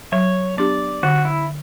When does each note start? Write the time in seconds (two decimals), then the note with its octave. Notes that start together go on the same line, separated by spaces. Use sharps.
0.12 F#3 C#5
0.57 B3 D4 G4 D5
1.03 D3 F#4
1.25 E4